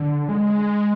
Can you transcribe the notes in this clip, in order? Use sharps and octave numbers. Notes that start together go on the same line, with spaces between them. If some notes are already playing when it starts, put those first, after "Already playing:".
Already playing: D3
G#3